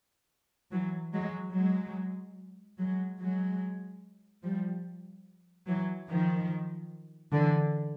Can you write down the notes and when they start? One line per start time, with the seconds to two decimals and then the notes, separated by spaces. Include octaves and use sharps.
0.72 E3 F#3
1.14 F#3 G#3
1.54 F#3 G#3
2.78 F#3 G#3
3.20 F#3 G#3
4.43 F3 G3
5.68 E3 F#3
6.09 D#3 F3
7.32 D3 E3